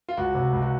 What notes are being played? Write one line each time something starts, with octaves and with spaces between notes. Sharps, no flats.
F4
C#2 F#4
C3
C#2
F#4